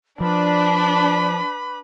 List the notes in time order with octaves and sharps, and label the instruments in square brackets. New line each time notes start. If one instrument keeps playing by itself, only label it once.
[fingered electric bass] F3 [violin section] D4 [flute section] B4 B5 D6